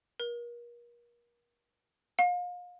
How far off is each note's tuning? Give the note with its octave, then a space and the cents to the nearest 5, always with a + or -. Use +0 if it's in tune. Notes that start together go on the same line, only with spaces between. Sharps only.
A#4 +35
F5 +35